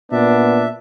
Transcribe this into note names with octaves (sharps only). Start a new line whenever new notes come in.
A#2 B3 D4 E5